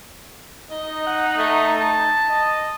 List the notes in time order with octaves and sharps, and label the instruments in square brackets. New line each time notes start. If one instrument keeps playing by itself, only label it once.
[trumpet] D#4 [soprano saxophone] D#5
[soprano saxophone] F#5
A3
A5
[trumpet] D#5